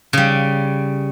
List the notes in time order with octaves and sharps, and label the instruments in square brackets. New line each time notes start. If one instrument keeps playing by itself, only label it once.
[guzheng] C#3 G3